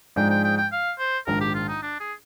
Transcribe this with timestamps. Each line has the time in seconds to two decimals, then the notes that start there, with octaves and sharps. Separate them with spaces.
0.16 G#2 F3 G#3 D4 G5
0.30 G5
0.44 G5
0.58 G5
0.72 F5
0.99 C5
1.27 A#1 G#2 D#3 A#4
1.41 G4
1.54 F4
1.68 D#4
1.82 D4
2.00 G#4